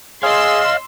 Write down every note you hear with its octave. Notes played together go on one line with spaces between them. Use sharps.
G#4 C#5 D#5 F5 C6 E6